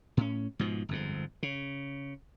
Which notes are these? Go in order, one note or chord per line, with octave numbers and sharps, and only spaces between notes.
A2 C#4
G#2 B2 F3
G1 F2 G#2
C#3